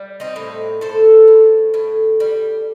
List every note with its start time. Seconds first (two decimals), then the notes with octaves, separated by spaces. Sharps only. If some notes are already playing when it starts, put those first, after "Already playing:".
Already playing: G3
0.20 C4 D#4
0.36 A2
0.81 A2 A4 C5
1.28 A2
1.74 A2
2.20 G3